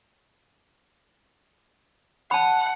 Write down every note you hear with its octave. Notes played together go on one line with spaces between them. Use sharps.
F#5 A5 B5